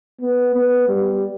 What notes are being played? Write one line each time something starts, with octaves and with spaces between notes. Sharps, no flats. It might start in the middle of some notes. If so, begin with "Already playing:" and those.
B3
B3
G3